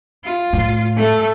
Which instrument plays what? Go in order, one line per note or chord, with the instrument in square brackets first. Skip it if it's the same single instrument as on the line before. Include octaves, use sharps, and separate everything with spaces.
[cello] F4
[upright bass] A2
[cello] A3 A4